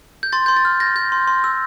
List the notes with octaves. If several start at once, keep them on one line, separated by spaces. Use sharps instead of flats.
G6
C6 A6
C6 G6
A6
F6
G6 A#6
G6
C6
C6
E6